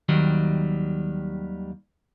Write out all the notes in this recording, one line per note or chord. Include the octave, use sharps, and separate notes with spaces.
D#2 D#3 F#3 G3